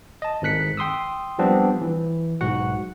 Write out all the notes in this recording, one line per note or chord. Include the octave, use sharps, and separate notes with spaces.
D#5 A5
G#1 G#2 D#3 F#6 B6 C#7
G5 C6 D#6 E6
F3 G3 B3 C4 D4
E3
B1 G#2 F#4 F#5